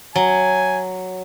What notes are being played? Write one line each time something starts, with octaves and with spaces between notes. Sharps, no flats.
F#3 G#5